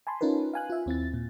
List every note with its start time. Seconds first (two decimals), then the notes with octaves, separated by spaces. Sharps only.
0.07 G#5 A5 B5 C6
0.21 C#4 D#4 F4 A#4 B4
0.54 F5 G#5 F#6
0.70 F4 E5
0.86 D#2 C4 E4 A6
1.14 A#2